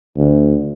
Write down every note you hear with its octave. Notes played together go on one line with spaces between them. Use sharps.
D2